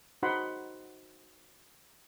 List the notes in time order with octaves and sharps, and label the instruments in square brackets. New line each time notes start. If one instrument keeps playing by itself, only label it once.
[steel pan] D#4 F#4 C5 F#5 B5 C6